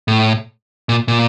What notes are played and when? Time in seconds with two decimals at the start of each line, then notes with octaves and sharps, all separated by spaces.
0.08 A2
0.89 A#2
1.08 A#2